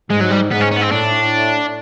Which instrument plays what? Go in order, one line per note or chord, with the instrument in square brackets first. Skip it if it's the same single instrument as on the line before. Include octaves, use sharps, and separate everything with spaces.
[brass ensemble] G#2 [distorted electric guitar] G#3
[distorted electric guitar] F#3
G3
[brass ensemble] G#2 [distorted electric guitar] B3
[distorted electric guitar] C#4
C#4
B3
C4
[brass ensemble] A2 [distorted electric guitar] D4